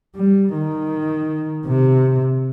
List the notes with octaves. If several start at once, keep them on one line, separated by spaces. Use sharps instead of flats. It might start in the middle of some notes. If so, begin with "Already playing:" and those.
G3
D#3
C3